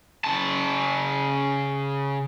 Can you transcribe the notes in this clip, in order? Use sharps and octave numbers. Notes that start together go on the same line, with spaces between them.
C#3 A5